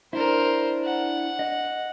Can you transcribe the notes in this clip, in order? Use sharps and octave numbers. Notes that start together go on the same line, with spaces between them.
D4 E4 A#4 C5
F#5
D#5